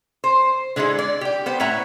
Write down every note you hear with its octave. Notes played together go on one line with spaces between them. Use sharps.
C5
D3 G#3 D#4 E4 G#4
D5
G4 G5
B3 C5
A2 C#5 E5 F#5 A#5